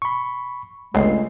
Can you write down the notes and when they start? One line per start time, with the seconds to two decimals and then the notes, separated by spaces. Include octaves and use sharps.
0.02 B5 C#6
0.94 G1 C#2 G#3 A3 C7